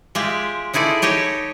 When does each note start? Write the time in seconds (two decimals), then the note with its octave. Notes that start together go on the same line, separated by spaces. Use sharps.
0.15 G#3 F4 G4 D5 E5
0.73 D#4 E4 G#4 A4 D5
1.02 D#4 G4 C#5 D#5